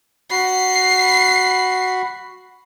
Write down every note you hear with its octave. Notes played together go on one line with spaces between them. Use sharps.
F#4 B5 C7